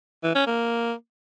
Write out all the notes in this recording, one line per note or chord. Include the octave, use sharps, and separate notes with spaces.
E3
C#4
A#3